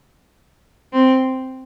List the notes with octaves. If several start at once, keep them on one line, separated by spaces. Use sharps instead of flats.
C4